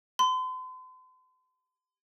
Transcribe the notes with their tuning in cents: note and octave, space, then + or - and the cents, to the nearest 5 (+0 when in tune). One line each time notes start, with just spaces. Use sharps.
C6 -40